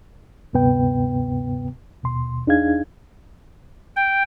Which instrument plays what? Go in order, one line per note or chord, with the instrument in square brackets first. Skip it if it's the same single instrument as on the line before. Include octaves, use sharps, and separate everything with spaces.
[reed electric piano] D2 G2 C3 B3 B4 G5
D#2 B2 C6
E2 D4 D#4 G#4 F5 G#6
[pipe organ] G5